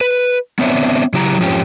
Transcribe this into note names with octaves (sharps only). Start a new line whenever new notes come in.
B4
B3 C4 D4 C#5 E5
C#3 F#3 E4 G4 A5 A#5
F2 G#2 F3 C#4 G4